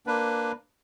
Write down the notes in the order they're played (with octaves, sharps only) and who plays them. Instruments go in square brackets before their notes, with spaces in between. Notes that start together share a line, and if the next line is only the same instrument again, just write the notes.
[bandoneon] A#3 D4 B4